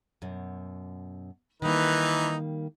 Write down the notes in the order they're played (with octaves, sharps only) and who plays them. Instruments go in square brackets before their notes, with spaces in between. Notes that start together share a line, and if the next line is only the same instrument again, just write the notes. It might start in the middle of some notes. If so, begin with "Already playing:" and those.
[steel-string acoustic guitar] F#2 B2
[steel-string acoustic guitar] D#3 G3 A#3 [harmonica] E3 D#4 B4